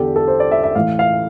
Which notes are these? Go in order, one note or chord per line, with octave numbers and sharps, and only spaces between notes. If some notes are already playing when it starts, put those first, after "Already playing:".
Already playing: E2 D3 G4 A4
A4
C5
D5
E5
E5
A2 E3 F5
F5